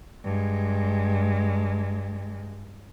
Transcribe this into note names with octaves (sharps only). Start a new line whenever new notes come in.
G2 G#3